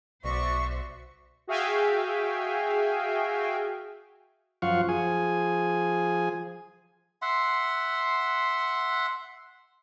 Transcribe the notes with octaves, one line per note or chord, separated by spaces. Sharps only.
B1 F#4 C5 D5 E5 C#6
F#4 G#4 E5 F5 G5 G#5
F#2 F3 F4 F5 F#5 C#6
F3 G#4 G#5
E5 F#5 C6